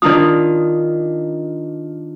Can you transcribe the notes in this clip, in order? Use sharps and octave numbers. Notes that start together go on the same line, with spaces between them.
D#3 D4 F4 D5 D#6